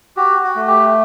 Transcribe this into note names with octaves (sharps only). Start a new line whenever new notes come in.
F#4 G4
F#4
A3
G4